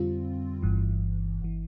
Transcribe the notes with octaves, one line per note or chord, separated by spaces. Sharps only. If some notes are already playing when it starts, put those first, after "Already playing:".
Already playing: F2 D3 G3 C4 F4
G1 G2 E3
G1 E3